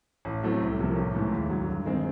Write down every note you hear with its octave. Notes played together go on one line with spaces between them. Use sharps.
A1
A2 F#3 A3 C4
C2
C3 F3 A#3
A1
G#2 E3 A3
D#2
D3 F#3
G2
D#3 G#3 C4